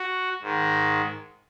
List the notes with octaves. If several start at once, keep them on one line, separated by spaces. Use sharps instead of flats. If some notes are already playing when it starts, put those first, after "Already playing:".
Already playing: F#4
G#2 D#3